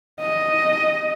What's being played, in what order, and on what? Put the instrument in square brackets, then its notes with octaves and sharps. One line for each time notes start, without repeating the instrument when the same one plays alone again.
[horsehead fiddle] D#5